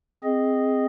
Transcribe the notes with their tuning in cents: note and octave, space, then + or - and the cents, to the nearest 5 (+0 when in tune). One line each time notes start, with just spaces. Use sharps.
C4 +0 G#4 +0 D#5 +0